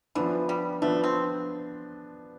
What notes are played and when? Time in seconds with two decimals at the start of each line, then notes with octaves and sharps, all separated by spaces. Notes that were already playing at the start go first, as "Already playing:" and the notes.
0.15 E3 F3 B3 D4
0.49 G3
0.82 F3 A3 B3 D4
1.04 C4